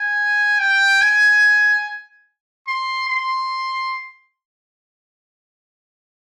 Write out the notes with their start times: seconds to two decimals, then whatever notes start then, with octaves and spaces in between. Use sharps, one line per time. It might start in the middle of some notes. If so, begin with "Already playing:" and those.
Already playing: G#5
0.59 G5
1.01 G#5
2.67 C6
3.09 C6